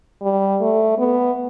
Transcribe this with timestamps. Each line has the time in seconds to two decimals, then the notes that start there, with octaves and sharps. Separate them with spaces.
0.22 G3
0.61 A3
0.99 B3